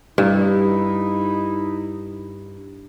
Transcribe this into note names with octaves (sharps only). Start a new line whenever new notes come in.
G2 D#4 E4